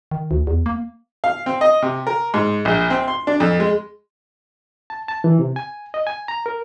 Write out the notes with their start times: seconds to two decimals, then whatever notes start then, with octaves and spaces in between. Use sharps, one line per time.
0.11 D#3
0.31 D2
0.47 E2
0.66 A#3
1.24 F5
1.46 C4
1.61 D#5
1.82 C3
2.07 A#4
2.34 G#2
2.65 A#1
2.90 C4
3.08 C6
3.27 D4
3.40 F2
3.60 G#3
4.90 A5
5.08 A5
5.24 E3
5.39 C3
5.56 G#5
5.94 D#5
6.07 G#5
6.28 A#5
6.46 A#4